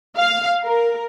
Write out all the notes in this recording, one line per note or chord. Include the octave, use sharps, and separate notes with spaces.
F5
A#4